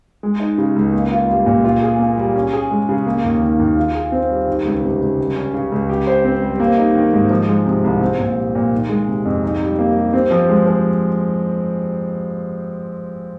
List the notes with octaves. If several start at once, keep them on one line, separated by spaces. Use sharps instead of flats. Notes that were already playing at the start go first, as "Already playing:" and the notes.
G#3
D#4
C#3
C#2
A#3
F4
G3
A#2
F4
G#4
A#3
G3
C#4
G#4
G#3
C#3
A#3
D#2
D#3
D#2
F4
G#4
C4
G3
D#3
C#2
C3
C#2
G3
C#4
C#3
C#2
G4
C5
C4
G3
A#3
D#4
D#3
G#2
F3
G#3
C3
C2
C4
A#2
G3
A#2
D#3
G#3
C3
F2
D#4
G3
A#3
G3
C4
F3
G#3
F3